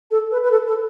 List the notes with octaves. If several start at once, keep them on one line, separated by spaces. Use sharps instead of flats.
A4
B4
B4
A4
A4